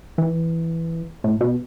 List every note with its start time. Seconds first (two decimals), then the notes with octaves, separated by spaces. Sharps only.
0.18 E3
1.24 A2
1.41 B2